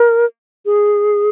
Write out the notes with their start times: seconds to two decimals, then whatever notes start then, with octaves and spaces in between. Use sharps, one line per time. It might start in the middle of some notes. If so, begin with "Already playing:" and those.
Already playing: A#4
0.65 G#4